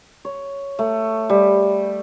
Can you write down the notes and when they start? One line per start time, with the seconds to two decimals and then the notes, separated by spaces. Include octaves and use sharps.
0.25 C#5
0.79 A3
1.30 G3